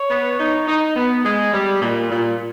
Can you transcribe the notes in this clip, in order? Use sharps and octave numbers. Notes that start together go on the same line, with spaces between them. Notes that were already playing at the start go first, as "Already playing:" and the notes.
Already playing: C#5
B3
D#4
D#4
B3
G#3
G3
A#2
A#2